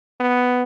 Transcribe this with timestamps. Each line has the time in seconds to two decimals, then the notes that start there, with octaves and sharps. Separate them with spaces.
0.20 B3